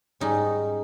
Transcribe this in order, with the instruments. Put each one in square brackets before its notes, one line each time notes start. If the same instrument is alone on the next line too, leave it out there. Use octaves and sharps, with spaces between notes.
[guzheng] G#2 G3 C#4 D#4